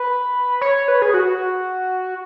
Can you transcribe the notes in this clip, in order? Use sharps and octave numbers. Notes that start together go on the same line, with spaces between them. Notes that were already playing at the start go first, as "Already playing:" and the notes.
Already playing: B4
C#5
B4
G#4
F#4